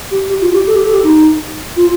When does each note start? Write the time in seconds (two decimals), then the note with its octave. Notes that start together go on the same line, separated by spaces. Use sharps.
0.11 G4
0.29 G4
0.41 F4
0.53 G4
0.67 A4
0.75 G4
0.85 A4
0.93 G4
1.03 D#4
1.76 F4